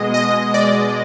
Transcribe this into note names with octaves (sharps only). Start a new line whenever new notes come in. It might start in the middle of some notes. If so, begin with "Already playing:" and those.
Already playing: B2 G#3 D#5
D#5
D5